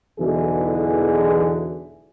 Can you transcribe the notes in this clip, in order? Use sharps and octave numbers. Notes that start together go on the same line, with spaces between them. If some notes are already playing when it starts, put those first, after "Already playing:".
B1 E2 B2 D3 E3 G#4